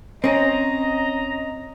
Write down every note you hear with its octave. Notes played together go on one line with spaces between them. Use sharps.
C4 C#4 D#5 A#5